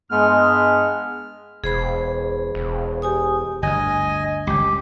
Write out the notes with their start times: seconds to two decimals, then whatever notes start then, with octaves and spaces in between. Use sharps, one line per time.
0.10 G2 G#3 B3 F6
1.64 E1 G#4 C5 B5
2.55 E1
3.02 G4 G#5 D#6
3.63 G1 D2 D#5 G#5
4.47 G1 C#2 G4